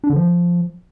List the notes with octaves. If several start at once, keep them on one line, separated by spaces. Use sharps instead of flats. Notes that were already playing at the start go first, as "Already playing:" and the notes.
D4
D3
F3